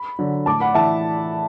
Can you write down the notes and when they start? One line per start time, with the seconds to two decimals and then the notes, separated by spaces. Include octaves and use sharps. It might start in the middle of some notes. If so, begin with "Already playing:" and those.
Already playing: B5
0.19 D3 F#3
0.46 A2 A5 D6
0.60 F#5 B5
0.74 E3 E5 A5